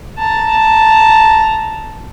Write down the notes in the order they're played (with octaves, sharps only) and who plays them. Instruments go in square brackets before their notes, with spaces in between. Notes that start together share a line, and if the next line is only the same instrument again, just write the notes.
[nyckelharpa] A5 A#5